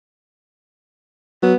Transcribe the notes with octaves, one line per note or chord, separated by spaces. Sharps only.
F#3 B3